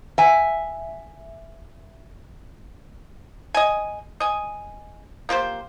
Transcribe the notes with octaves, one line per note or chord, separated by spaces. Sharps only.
E5 G#5
D#5 G#5
D#5 G#5
A#3 F4 G4 C5